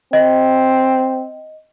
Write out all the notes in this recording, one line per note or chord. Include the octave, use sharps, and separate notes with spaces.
C4 D#5